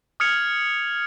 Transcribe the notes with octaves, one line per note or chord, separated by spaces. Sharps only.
D#6 F6 G#6 C#7 F7